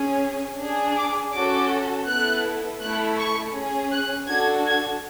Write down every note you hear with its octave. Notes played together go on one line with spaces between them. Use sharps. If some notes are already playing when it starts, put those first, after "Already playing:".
Already playing: C#4 G#4
D4 G#4
D6
C#4 F#4 A4 D6
B3 E4 A4 F#6
A3 E4 A4 F#6
C#6
C#4 G#4
F#6
D4 F#4 A4 G#6
G#6